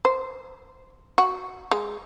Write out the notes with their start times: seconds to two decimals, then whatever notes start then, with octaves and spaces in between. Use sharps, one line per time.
0.05 C5
1.18 F#4
1.71 G#3